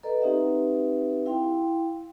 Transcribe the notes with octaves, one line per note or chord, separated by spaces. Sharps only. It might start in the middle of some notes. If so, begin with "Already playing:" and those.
A4 B4 D5 D#5 A#5
C4 D#4 G4 B4 E5 F#5
E4 F5 G5 C6